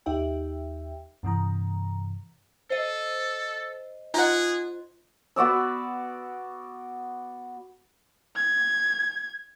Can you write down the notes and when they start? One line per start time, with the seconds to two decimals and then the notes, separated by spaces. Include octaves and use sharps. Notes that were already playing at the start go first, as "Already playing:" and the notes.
0.06 D#2 D#4 G4 E5 G5
1.23 G2 C3 E3 A#5
2.70 A4 C5 D#5
4.14 D#4 F4 G#4 F#5
5.36 B3 F#4 D5 E6
8.36 G#6